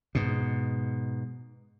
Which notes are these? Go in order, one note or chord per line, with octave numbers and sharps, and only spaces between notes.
G#2 B2